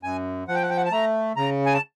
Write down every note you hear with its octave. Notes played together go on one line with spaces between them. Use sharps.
F#2 G#5
F3 F#5
G5
F#5
G5
F#5
A5
A3 A#5
C#3 A#5
G#5
A5